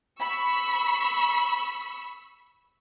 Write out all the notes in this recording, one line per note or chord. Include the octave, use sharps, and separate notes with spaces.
B5 C#6 E6